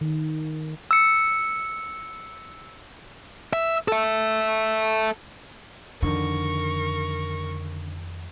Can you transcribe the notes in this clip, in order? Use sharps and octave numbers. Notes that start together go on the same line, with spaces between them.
D#3
E6 C#7
E5
A4 E5
F2 D3 D#3 A#4 C#6